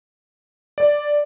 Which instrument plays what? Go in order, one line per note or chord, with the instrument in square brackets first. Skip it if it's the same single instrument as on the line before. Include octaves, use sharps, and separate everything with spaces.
[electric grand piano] D5